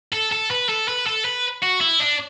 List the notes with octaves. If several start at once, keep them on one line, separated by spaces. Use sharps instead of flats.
A4
A4
B4
A4
B4
A4
B4
F#4
E4
D4